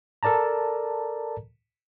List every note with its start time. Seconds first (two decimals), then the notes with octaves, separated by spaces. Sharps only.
0.23 A4 A#4 D5 A5 A#5